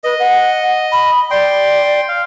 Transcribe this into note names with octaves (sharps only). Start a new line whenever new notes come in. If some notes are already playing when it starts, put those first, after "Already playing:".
B4 D#5
F#5
B5
D5 G5 C6
F5